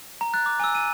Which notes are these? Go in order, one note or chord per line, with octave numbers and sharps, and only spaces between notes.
A#5
F#6 A6
D6
G#5 A#5 E6
D#7